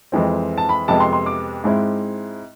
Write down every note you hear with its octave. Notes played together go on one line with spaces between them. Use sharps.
F2 E3 G#3 C4
A5
B5
F2 C3 G#3 B3 A5
C6
C6
D6
G#2 G#3 C4 E4